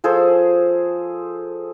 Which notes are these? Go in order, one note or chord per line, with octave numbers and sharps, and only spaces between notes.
F3 G#4 A4 C5